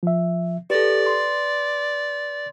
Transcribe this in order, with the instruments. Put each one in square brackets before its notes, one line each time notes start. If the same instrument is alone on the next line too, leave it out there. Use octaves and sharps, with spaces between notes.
[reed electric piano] F3 E5
[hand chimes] G4 A4 [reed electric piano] B4 [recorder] D5
[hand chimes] C6